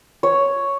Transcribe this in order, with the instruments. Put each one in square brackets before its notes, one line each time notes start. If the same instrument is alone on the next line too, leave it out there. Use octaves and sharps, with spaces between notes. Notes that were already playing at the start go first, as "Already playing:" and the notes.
[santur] C#5